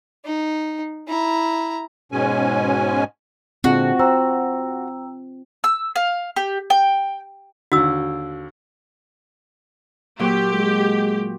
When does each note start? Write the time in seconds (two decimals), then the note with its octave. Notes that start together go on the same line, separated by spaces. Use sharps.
0.25 D#4
1.08 E4 A#5
2.12 G#2 B2 G#3 C#4 G#5
3.64 A#2 D3 G#3 C4 F4 F#4
3.99 C5 G5 A#5 E6
5.64 E6
5.96 F5
6.36 G4
6.70 G5
7.72 D#2 D3 F#4 E6
10.19 A#2 F#3 G4
10.53 G#3